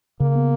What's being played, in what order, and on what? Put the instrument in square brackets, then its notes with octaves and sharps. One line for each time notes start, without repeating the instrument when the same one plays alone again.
[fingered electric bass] C#3 [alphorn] A#3
[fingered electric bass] B3